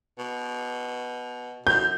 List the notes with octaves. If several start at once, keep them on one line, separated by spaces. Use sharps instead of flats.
B2
F#2 G6